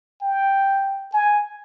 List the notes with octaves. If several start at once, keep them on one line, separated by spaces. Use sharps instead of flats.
G5
G#5